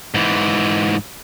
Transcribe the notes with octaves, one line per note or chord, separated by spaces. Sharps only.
G#2 E3